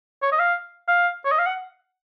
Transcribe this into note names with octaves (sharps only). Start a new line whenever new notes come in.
C#5
D#5
F5
F5
C#5
D#5
F5
F#5